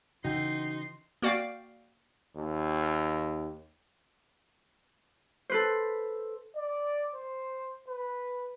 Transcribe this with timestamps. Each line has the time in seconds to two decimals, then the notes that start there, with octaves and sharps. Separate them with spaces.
0.25 C#3 E3 D#4 F#4 G5 C6 G6
1.22 A#3 F#4 D5 F5 G5
2.35 D#2
5.49 A4 B4 C5
6.56 D5
7.15 C5
7.88 B4